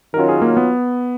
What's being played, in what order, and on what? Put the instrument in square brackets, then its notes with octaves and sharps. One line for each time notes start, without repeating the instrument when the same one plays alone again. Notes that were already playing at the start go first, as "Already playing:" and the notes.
[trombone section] D#3 F#3 C#4 F4 [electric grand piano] A#4
[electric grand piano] G#4
A#3
B3